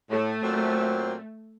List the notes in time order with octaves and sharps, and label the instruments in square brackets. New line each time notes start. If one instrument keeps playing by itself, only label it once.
[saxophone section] A2 [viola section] A3
[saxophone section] A#2 F#3 C4